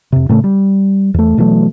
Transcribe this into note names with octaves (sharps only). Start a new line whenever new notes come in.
F2 C3
A2 C#3 A3
G3
E2 A3
B2 E3 F#3 A3